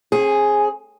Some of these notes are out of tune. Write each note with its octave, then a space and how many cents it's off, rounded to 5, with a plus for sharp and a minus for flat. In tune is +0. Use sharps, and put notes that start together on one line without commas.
C4 +40 G#4 +0